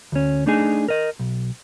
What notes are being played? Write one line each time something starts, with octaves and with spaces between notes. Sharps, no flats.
D2 C#4
A3 D4 D#4 G#4
A#4 D#5
B1